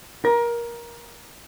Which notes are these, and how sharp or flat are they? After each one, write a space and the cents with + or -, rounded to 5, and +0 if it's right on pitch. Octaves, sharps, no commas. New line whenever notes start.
A#4 +20